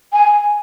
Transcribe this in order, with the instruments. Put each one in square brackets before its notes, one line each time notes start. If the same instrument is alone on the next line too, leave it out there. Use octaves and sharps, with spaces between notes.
[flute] G#5